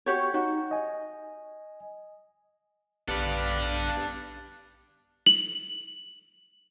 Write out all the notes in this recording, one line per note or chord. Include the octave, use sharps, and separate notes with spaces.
F#4 G4 C#5
D#4 F#4
D#5 G#5
A#1 B3 D4 G4 A4 B4 D5 F5
F#7